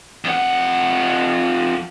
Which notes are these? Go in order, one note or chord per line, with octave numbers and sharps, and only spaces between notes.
F2 F#5